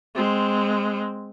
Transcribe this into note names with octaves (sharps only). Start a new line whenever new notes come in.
G#3 C4